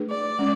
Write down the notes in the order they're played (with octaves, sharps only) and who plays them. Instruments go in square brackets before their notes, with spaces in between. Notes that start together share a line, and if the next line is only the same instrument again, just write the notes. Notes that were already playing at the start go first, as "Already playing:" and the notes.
Already playing: [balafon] A3 D4 G#4 B4
[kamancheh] D5
[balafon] G#3 C#4